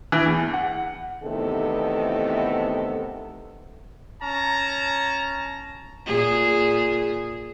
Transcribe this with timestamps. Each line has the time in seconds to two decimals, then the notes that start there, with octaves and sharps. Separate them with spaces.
0.12 E3
0.26 E2
0.54 F#5
1.23 E2 C3 D#3 A3 B3 A4
4.22 C#4 A5 A#5
6.06 A#2 G#4